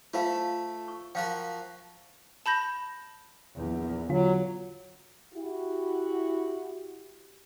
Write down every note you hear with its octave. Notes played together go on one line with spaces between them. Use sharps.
A3 F4 A4 C5 F5
C#6
F3 F#4 A#4 F5 G5
A5 B5 G6 A#6
A#1 E2
D3 F#3 F4
E4 F#4 G4